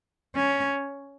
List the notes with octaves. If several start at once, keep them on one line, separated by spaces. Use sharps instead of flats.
C#4